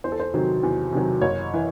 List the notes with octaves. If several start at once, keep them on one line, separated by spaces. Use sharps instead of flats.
E2 C5
A4
C5
C3 D#3 F#3
E2
C3 D#3 F#3
F#1 C#5
E3